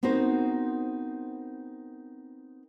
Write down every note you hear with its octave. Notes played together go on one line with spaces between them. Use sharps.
B3 C4 D#4 F#4 A#4 C5